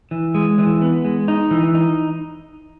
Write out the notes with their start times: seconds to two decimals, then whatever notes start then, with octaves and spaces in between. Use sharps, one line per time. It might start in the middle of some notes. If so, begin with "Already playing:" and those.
0.11 E3
0.35 G#3
0.58 E3
0.81 B3
1.05 G#3
1.28 D#4
1.51 E3
1.75 D#4